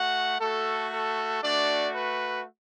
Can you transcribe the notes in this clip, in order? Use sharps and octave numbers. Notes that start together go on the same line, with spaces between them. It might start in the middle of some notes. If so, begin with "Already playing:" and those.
Already playing: A3 F#4 F#5
A3 F#4 A4
A4
A3 D4 F#4 D5
B4